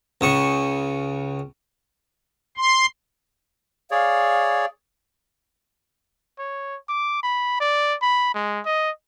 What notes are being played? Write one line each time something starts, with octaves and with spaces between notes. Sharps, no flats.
C#2 C#3 C#6
C6
G#4 C#5 D5 F5
C#5
D6
B5
D5
B5
G#3
D#5